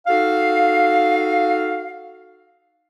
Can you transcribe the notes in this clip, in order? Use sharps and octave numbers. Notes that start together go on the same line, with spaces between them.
D#4 F#4 A4 F5